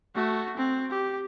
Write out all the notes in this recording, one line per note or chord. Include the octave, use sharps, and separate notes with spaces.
A3 F#4
C4
G4